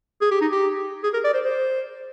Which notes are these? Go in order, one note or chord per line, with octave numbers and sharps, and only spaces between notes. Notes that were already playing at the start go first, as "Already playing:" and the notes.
G#4
G4
D#4
G4
G#4
A#4
D5
C5
C5